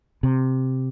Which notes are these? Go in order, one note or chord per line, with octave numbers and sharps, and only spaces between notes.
C3